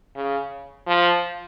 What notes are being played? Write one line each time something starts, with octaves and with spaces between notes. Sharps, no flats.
C#3
F3